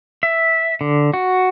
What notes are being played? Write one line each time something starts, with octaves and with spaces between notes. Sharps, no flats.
E5
D3
F#4